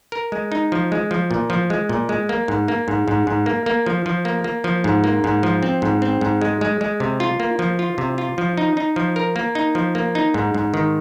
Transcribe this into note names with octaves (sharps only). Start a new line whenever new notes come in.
A#4
G#3
D#4
F3
G#3
F3
A#2
F3
G#3
A#2
G#3
A#3
G#2
A#3
G#2
G#2
G#2
A#3
A#3
F3
F3
A#3
A#3
F3
G#2
A#3
G#2
F3
C4
G#2
C4
G#2
G#3
G#3
G#3
C3
F4
A#3
F3
F4
C3
F4
F3
D#4
D#4
F3
A#4
A#3
D#4
F3
A#3
D#4
G#2
G#2
D#3